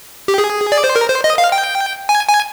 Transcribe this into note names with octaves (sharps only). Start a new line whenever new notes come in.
G4
G#4
D5
C5
A#4
C5
D#5
F5
G5
G#5
G#5